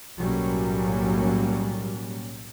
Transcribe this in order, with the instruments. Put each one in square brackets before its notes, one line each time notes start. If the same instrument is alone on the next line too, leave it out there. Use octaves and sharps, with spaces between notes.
[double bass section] B1 A2 F#3 G3 A#3 C#4